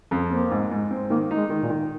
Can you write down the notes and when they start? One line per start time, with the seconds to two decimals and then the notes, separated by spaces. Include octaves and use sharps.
0.11 F2
0.31 A#3 C4
0.51 G#2
0.71 G#2
0.91 C4
1.10 D#3 A#3
1.31 D#4
1.37 G#3
1.50 D#3
1.63 A#2
1.70 D#3